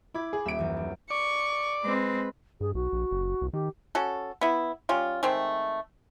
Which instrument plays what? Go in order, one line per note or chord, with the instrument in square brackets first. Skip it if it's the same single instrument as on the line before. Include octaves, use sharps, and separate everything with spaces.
[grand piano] E4 [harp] B5 D6 G#6
[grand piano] G#4
[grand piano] D#1 D7 [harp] E5
[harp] F#2 E3
D4
[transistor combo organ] D5 [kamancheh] C#6
[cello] G#3 C4 [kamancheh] B4
[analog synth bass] G2 [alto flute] G#4
[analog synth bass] B1 [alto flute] F#4
[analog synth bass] A#1
F#1
C2
[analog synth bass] D#3 [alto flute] G4
[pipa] C#4 F#4 A4
B3 E4
G3 C#4 F4
D#3 G#3 A3 C4